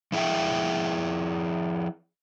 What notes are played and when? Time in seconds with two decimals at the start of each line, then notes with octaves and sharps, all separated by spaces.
0.12 F3 E4 G#4 E5 G5